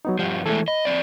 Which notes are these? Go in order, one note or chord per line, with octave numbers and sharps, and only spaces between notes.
F#3 B3 D#4
G2 F3 G3 F5 F#5
E3 G#3 A3 A4
D#5 B5
F2 C4 D5